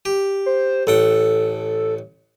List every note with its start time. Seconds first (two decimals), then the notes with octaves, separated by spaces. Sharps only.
0.05 G4
0.46 C5
0.87 A1 A4 F#5 G5